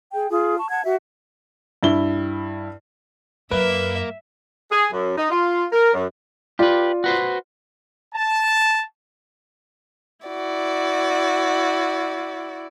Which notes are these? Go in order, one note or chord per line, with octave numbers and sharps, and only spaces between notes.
G#4 G5
F4 G#4 D#6
A5 C#6
F#5 A5 G#6
F#4 E5
G2 E4 G7
F#2 A#3 B4 E5
G#4
F#2
D#4
F4
A#4
F#2
F4 G4 B4 D5
F#4 B4 C5
A5
E4 F#4 D5